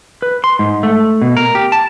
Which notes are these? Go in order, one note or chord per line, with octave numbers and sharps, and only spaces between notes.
B4
C6
G#2
A3
B2
A#4
G4
A5